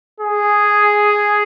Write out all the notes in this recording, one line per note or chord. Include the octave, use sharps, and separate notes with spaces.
G#4